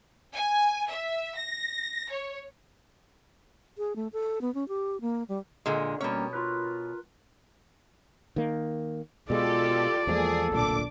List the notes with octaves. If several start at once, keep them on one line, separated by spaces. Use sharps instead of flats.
G#5
E5
A#6
C#5
G#4
A3
A4
B3
C#4
G4
A#3
G3
A#2 D3 G#3
B2 G3 A#3 C#4 C#5
F4 A#4 B4
D#3 A#3
B2 G#3 F4 G4 A4 D5
E2 F3 G#3 A#3 G#4 A4
D1 B1 A#2 D4 D6